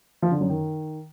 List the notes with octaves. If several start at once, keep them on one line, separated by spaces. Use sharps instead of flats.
F3
D3
F#2
D#3